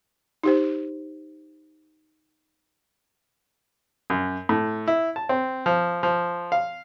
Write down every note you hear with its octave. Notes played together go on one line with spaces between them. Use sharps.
D#4 G4 C5
F#2
A2
E4
A5
C4
F3
F3
F5